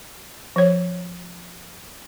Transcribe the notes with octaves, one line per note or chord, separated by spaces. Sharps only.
F3 C#5